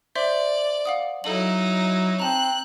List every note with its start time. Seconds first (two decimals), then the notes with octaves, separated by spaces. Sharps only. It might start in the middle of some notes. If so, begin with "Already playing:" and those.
0.16 C5 D5 E5 C6
0.85 F5 F#5 D#6
1.24 F#3 D#4 E4 A4 F#7
2.20 C4 A5 A#5 F#6